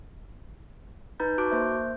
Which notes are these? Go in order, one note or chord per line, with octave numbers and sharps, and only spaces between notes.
D#4 B4 A#5 B5 G6 A6
F#4 A5 C#6 D6 F#6 D7
A#3 C5 E5 G6